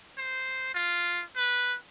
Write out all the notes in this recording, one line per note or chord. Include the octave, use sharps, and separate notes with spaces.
C5
F4
B4